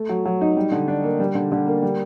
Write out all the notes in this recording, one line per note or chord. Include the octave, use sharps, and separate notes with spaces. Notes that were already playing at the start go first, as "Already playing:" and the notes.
Already playing: A3
F#3
F#3
D#4
G3
D3
D4
A#3
G3
D3
D3
A#3
G3